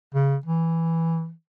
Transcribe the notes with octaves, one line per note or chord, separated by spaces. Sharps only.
C#3
E3